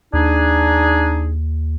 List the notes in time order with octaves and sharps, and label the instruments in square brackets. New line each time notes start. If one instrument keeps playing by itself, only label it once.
[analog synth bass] D#2 [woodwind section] D4 D#4 G#4